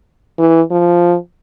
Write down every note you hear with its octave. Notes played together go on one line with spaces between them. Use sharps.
E3
F3